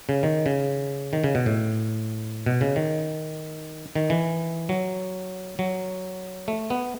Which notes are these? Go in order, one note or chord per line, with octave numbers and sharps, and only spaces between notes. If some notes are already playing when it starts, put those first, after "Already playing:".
C#3
D#3
C#3
D#3
C#3
B2
A2
B2
C#3
D#3
D#3
E3
F#3
F#3
A3
B3